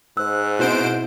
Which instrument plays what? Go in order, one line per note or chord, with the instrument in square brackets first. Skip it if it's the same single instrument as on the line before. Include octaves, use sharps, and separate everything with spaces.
[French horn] G#2 [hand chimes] C5 E6 [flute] F#6
[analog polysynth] B2 C5 D7 [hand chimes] C4 E4